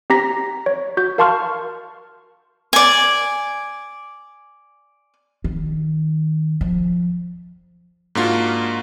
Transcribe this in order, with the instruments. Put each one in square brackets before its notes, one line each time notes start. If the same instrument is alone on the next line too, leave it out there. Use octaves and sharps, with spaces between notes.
[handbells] C4 G4 A#5 A#6 B6
C#5
F#4 G6
A#4 F5 A5 C6 C#6 F6
[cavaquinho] D5 G#5
[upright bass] D#3
F3
[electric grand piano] G#2 A#3 D4 F4 F#4